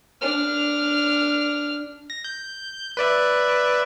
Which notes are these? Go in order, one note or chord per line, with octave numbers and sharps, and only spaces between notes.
D4 F6
A#6
G6
B4 D5 E5